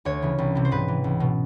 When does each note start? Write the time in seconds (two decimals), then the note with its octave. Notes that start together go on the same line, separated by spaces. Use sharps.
0.05 D2 C#5
0.22 C#3 E3
0.38 C2
0.55 C3 E3
0.65 C5
0.71 G#2 B4
0.88 E3
1.04 C#2
1.20 B2